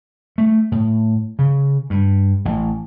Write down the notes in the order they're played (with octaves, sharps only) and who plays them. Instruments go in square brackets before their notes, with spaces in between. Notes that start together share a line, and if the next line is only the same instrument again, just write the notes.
[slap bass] A3
A2
C#3
G2
A1